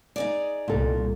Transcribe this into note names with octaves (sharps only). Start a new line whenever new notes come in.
D#4 G#4 D5
C2 A#2 A4